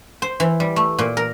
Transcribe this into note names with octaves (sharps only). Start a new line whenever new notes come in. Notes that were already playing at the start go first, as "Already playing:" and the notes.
C5
E3
G3
A3
A#2
A#4